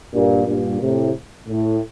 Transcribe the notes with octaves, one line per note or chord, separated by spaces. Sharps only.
G2 A#2
G2 A#2
A2 C3
A2